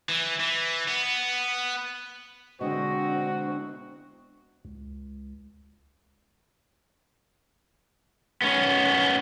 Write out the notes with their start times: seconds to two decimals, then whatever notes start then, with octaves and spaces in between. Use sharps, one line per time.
0.09 E3
0.40 E3
0.88 B3
2.61 B2 D3 G#3 C4 D4 F#4 D#5
4.65 C#2
8.42 B3 C#4